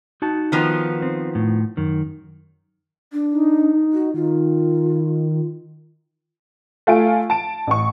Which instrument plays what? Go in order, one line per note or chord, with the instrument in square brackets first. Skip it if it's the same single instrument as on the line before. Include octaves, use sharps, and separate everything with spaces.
[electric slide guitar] D#4 F#4 A5
[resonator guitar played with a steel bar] D#3 F3 B3
[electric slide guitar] C4
A2
F#2 D#3
[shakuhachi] D4
[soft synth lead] D#4
[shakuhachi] F#4
[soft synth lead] D#3 [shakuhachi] F4
[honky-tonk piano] A3 F4 G#5 D7
A5 D7
A1 C#6